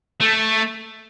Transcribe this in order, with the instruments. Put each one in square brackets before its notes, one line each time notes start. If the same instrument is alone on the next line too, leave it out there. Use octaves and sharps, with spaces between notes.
[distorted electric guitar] A3